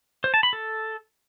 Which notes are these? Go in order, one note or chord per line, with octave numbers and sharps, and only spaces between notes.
C5
A5
B5
A4